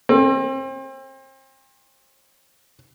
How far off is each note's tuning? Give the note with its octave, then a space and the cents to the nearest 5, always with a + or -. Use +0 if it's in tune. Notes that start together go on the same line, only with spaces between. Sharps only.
C4 +35